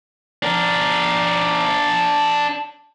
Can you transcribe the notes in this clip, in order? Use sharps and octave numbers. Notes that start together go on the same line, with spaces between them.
D4 A#4